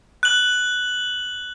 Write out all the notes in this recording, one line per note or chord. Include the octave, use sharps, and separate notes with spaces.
F#6 F#7